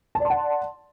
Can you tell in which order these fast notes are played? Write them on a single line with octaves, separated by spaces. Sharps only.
A5 D5 C6 F#5